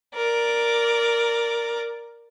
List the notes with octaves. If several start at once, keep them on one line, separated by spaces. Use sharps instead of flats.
A#4 D5